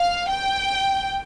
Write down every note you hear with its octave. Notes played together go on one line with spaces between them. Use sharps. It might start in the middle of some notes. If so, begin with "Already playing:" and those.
Already playing: F5
G5